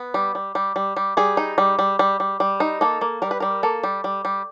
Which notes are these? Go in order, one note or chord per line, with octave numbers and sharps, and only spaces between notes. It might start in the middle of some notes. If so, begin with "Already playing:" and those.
Already playing: B3
G3
G3
G3
G3
G3
G3 G#4
D#4
G3
G3
G3
G3
G3
D#4
A#3 A4
A#3
G3 A#4
B4
G3 A#4
A#3 A4
G3
G3
G3